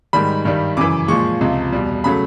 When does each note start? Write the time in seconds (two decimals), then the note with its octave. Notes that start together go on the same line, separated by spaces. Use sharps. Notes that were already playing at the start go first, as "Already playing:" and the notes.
0.13 G#2 D#3 G3 B5
0.45 G2 D#3 G3
0.77 F#2 C#3 E3 D6
1.08 A#2 F3 G#3 C#6
1.41 C#2 C3 F3
1.72 E2 B2 G3
2.04 C#3 F#3 A3 B5